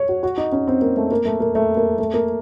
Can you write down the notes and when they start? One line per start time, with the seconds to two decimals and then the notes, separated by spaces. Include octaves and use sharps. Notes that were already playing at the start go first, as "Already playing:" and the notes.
Already playing: C#5
0.09 F#4
0.23 F#4
0.38 D#4
0.52 C#4
0.68 C4
0.82 A#3
0.97 A3
1.12 A#3
1.25 A3
1.40 A#3
1.55 A3
1.77 A#3
1.99 A3
2.14 A#3